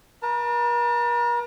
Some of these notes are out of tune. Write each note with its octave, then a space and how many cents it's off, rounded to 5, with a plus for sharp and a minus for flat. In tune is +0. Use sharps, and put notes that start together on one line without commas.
A#4 +45 A5 +40